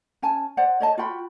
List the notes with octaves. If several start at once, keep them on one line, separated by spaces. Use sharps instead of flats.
C#4 G#5 A5
C5 D5 F#5
C#5 D#5 A5
F4 F#4 G5 B5